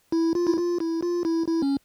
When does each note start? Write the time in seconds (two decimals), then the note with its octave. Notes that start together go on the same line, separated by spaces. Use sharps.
0.12 E4
0.35 F4
0.47 E4
0.57 F4
0.80 E4
1.02 F4
1.25 E4
1.48 E4
1.62 C#4